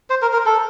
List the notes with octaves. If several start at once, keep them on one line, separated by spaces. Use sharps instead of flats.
C5
A#4
A#4
A4